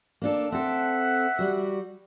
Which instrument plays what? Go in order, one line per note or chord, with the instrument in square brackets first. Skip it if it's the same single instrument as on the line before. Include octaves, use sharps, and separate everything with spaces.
[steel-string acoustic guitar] A#3 D4 A4
[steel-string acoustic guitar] C4 A4 [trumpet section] E5 F#5
[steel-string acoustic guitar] G3 F#4